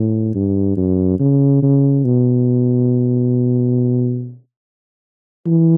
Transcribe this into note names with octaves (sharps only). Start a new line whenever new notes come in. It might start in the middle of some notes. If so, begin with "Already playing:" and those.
Already playing: A2
G2
F#2
C#3
C#3
B2
E3